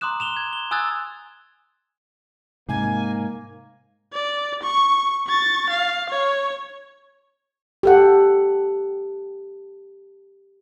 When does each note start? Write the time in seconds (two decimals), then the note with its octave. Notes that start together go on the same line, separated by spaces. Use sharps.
0.01 A#5 C6 D6 D#6 F#6 E7
0.20 E7 F7 G7
0.37 G#6
0.53 G7
0.71 G#5 D#6 E6 F#6 G#6 A6
2.69 G#2 C3 A#3 G#5
4.13 D5
4.63 C#6
5.27 C#6 A6
5.70 F5
6.10 C#5
7.83 G4 A4 F#5